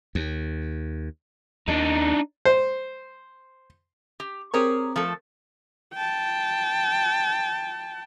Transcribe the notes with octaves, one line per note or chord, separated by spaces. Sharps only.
D#2
D#2 D4 D#4
C5
G4
C4 G4 G#4 A#4 C#5
F3 A3 A4
G5 A5